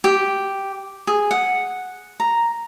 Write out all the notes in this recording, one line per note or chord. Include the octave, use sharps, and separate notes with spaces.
G4
G#4
F#5
A#5